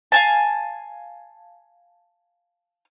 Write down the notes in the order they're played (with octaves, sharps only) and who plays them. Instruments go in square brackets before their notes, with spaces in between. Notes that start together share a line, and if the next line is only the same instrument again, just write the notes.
[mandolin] F5 G#5 A5